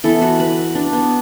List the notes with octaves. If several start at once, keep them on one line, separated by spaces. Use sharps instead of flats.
E3 B3 A4
F#4
B4
D4
B3